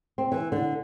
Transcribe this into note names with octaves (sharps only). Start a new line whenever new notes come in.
C4
E3
D3